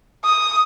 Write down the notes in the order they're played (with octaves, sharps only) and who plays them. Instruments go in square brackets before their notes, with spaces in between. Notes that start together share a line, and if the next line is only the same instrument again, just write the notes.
[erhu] D#6